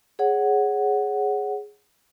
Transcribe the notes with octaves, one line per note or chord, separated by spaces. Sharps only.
G#4 C#5 F#5